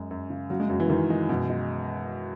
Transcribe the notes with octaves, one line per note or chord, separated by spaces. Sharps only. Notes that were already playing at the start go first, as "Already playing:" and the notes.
Already playing: F#2 G#3
F#2
C#3
C#3 F#3
G#3
F#2 F#3
E3
F#2 D#3
G#3
F#2 B2
G#3